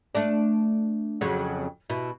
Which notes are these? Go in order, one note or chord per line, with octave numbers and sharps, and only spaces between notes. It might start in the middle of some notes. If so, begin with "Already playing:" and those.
A3 D4
F2 C#3 F#3
B2 E4